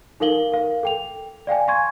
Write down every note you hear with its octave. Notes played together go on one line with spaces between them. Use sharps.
D#4 A4 A#4 F5 F#7 G7
A#4 F5
A4 G5 F7
D5 F5 G5 G#5
G#5 C6 C#6 G#6